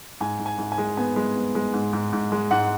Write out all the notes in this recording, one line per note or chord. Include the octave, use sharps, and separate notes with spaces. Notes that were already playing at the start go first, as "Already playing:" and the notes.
G#2 G#5
G#2
G#5
G#2
G#5
G#3
B3 G#5
G#3
B3
G#3
G#2
G#2
G#2
G#3
G#2 F#5